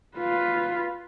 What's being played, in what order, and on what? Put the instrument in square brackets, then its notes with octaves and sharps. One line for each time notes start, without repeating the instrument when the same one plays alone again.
[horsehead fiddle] F4 B4